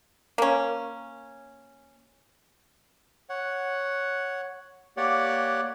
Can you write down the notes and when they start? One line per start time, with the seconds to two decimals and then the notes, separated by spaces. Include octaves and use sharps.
0.38 A#3 C#4
3.30 C#5 F#5
4.97 A#3 G4 C#5 D5 F#5